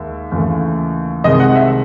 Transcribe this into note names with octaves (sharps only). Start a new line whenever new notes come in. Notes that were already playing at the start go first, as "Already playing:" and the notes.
Already playing: D#2 D#3 G#3 E5
D#2 C#3 E3 A3
C2 C3 D#3 G#3 D#5
F#5
E5